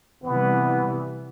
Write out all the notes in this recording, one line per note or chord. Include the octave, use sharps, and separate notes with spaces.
C3 E3 G3 B3